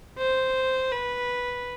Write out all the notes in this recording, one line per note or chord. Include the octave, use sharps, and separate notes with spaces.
C5
B4